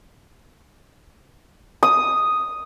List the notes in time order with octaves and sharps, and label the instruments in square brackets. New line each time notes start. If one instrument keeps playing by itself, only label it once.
[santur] D#6